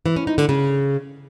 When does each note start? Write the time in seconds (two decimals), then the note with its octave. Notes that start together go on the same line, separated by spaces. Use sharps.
0.06 E3
0.16 C#4
0.27 D#4
0.38 D3
0.49 C#3